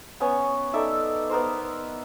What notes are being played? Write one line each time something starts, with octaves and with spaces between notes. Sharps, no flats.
B3 C#4 C#5 G#5
D#4 A4 D5 E5
B3 A#4 C5